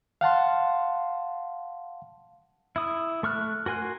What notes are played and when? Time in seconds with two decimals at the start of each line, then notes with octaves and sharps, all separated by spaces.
0.21 F5 F#5 A5 C6
2.76 E4 D#6
3.23 A3 C#6 F6 F#6
3.66 F#4 A#4 G#5 C6 F#6